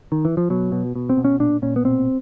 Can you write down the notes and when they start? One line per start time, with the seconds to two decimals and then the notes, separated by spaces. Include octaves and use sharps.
0.12 D#3
0.25 E3
0.37 F3
0.50 B2 F#3
0.72 B2
0.95 B2
1.09 C4
1.17 B2
1.25 C#4
1.40 A#2 D4
1.62 A#2 C#4
1.76 B3
1.85 B2 C4